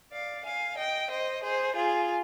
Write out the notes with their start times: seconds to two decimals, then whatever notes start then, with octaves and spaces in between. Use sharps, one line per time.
0.12 D5 F5
0.44 F5 G#5
0.77 D#5 G5
1.10 C5 D#5
1.42 G#4 C5
1.75 F4 G#4